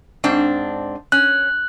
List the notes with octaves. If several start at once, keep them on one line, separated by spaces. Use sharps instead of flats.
G#2 C4 D4
C#4 F#6